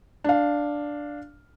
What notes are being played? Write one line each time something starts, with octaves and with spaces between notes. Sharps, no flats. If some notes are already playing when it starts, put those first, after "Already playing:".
D4 F5